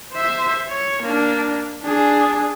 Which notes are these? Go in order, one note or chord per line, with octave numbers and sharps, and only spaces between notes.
C5 E5
C#5
A#3 D4
D4 G#4